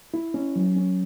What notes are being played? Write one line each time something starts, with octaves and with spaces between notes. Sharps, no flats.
E4
C#4
F#3
C#4